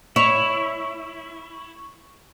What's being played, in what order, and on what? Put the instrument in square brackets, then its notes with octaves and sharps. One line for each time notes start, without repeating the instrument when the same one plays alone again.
[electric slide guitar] E4 [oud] C#5 [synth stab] C#6